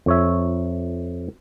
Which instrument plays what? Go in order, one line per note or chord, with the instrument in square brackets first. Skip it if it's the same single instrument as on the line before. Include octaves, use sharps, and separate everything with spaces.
[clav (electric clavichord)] F2 C#5 E5